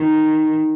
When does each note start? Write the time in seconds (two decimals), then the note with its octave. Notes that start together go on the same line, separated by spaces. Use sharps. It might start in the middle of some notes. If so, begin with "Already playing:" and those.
Already playing: D#3